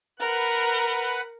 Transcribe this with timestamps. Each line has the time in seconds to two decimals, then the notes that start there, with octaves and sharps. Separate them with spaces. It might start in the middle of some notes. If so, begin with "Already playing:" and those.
0.19 A#4 B4 F#5 F#6